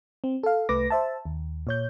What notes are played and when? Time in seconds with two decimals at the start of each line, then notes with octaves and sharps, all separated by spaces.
0.24 C4
0.43 A4 F5
0.69 C2 A3 B4 D6 A#6
0.90 C5 E5 A5
1.25 D#2
1.67 A#2 C#5 G6